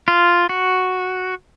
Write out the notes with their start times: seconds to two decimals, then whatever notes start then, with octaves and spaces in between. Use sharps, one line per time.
0.08 F4
0.49 F#4